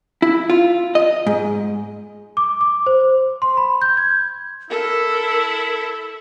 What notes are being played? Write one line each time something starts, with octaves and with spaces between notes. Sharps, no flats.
E4
F4
D#5
G#2
D6
D6
C5
C6
B5
G6
G#6
E4 A4 A#4